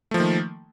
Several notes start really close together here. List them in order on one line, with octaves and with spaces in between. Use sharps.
A3 F3 A#3 D#3